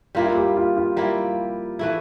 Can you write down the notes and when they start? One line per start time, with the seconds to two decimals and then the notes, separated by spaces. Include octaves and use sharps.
0.15 G3 A#3 E4 F4
0.26 F4
0.35 G4
0.57 F4
0.77 F4
0.97 G3 A#3 E4
1.79 E3 A3 E4